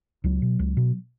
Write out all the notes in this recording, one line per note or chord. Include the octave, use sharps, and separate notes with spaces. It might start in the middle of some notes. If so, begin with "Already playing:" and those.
C#2 F#3
B2
C#2
B2